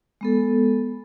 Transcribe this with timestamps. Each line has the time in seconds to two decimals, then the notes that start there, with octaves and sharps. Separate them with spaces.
0.21 G#3 B3 A4